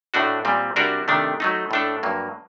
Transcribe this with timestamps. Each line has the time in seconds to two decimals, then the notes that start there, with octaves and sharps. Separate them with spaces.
0.14 A2 A3 D4 F#4
0.45 A#2 G3 C4
0.76 C3 G3 D4 F#4 A#4
1.08 C3 D#3 A3 D4
1.40 F#3 A3 D#4
1.71 A2 A3 D4 A4
2.03 G2 F#3 A#3